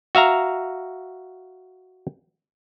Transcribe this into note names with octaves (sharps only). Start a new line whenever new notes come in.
F#4 E5 F5 A#5